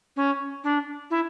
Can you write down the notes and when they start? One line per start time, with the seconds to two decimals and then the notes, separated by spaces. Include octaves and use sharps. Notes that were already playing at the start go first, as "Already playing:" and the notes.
0.16 C#4
0.64 D4
1.11 E4